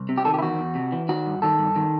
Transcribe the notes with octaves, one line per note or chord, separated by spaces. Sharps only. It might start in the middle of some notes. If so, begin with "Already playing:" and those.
Already playing: C2
C3
G4
D#3 A4
G4
E4
E2 F#4
E2
C3
E3
D#3 F#4
G2
D#3 A4
G2
D#3